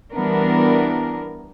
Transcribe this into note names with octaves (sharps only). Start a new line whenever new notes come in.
E3 G3 B3 D4 A#4